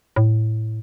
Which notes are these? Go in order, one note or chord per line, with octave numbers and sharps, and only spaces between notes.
A2